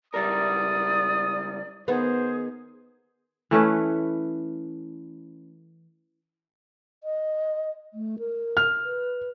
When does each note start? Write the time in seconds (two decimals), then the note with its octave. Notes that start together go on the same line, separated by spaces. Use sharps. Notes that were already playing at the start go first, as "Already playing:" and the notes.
0.14 C#2 G3 A#4 D5 D#6
1.88 D#3 B3 G#4 C5
3.51 E3 A3 C#4 B4
7.04 D#5
7.94 A3
8.19 A#4
8.57 F6
8.84 B4